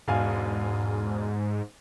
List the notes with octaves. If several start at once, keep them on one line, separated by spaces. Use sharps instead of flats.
E1 G#2 F5 G#5